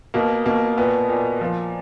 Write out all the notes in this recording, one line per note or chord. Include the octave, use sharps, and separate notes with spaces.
B2 A#3
B2 A#3
A#2 B3
A#2
F3